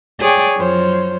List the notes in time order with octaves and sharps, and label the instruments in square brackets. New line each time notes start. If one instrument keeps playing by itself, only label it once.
[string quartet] G#4 C#5 D5 G5 G#5
F#2 F3 C5 C#5